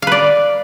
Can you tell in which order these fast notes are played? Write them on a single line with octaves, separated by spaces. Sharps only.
F5 B4 D5